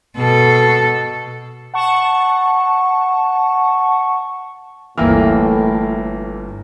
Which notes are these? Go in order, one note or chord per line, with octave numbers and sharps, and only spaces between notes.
B2 A4
F#5 A5 C#6
G1 A2 E3 A#3 G5 F6